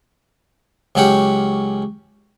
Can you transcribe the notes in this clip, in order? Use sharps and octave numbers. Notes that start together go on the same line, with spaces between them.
C#2 F#3 C#4 G4 F#5